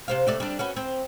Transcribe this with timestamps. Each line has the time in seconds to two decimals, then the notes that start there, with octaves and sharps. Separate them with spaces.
0.08 C3 C5 F5
0.27 C3 A3 D5
0.40 G3 D4
0.59 C#4 F#4 B4
0.76 C4